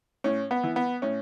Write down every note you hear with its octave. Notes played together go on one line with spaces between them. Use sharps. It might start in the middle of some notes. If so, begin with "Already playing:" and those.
A2 C#4
B3
E3
B3
A2 C#4